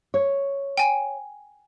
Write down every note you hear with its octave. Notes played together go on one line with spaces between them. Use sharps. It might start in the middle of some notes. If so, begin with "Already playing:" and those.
C#5
G5 G#5